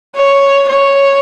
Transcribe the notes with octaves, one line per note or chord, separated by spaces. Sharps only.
C#5
C#5